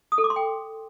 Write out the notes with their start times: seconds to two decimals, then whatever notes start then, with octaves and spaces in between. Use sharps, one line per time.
0.12 D#6
0.18 A4
0.24 D6
0.30 C6
0.36 G5